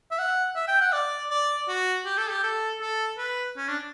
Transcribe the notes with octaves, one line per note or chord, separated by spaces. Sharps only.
E5
F#5
E5
G5
F#5
D5
D5
F#4
G4
A4
G4
A4
A4
B4
C#4
D4